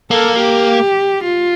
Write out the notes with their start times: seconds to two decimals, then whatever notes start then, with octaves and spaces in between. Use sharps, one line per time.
0.11 A#3 A4
0.39 G4
1.24 F4